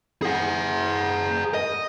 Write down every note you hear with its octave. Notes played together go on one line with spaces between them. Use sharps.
G#4 F#5
D#5